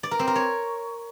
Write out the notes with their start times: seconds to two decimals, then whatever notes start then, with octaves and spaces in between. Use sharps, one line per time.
0.03 D5
0.11 A#4
0.19 C4
0.27 A#4
0.35 C#5